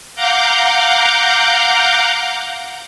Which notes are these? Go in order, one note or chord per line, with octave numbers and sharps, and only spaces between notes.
F5 F#5 A#5 D6 G6